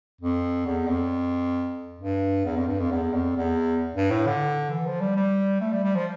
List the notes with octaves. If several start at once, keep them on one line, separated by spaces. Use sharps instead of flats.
F2
E2
F2
G2
E2
F2
G2
F2
E2
F2
E2
G2
A2
D3
E3
F3
G3
G3
A3
G3
G3
F3